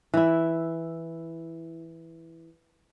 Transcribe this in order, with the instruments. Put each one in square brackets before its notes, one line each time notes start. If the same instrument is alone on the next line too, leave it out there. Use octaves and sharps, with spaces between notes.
[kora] E3 E4